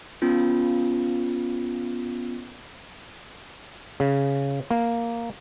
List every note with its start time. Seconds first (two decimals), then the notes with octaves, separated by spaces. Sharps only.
0.22 B3 C#4 F4
4.00 C#3
4.71 A#3